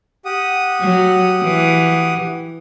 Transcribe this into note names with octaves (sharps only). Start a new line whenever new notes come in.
G4 F#5 D#6
F#3
E3